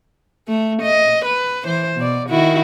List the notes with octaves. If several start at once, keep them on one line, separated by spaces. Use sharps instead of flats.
A3
D#5
B4
E3 C5
B2 D5
D#3 E4 F#4